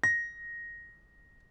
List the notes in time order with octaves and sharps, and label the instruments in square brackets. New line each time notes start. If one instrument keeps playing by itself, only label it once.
[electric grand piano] A#6